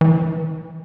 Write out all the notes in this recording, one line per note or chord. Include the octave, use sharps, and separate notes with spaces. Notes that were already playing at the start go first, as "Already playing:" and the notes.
E3